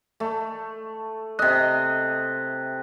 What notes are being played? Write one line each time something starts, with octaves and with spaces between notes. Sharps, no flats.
A3
C3 D#5 F#6